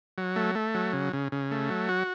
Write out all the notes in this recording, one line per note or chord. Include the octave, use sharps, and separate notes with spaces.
F#3
A3
A3
F#3
C#3
C#3
C#3
A3
F#3
F#4